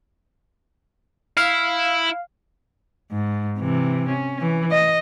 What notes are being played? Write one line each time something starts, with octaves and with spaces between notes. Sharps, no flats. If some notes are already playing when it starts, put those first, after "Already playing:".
E4 F5
G#2
C3 E3
C#4
E3
D#5